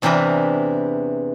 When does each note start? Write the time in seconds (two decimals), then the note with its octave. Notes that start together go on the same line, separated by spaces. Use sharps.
0.02 E2 C3 E3 D4 A#4 B4